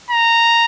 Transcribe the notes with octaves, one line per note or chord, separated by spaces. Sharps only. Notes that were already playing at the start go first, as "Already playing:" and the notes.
A#5